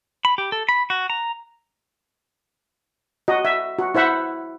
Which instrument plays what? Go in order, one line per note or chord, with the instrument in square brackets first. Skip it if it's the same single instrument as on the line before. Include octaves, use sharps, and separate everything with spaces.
[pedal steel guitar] B5
G4
A4
B5
F#4
A#5
[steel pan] F#4 D#5
E5
F#4
E4 C5 E5 F#5